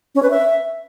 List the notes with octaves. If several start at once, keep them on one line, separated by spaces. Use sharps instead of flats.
C#4
B4
E5